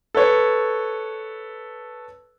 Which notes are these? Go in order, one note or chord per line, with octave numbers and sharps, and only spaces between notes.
A4 B4 C#5